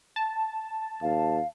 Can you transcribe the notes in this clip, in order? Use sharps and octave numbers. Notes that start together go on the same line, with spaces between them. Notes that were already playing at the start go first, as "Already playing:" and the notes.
A5
D#2 F5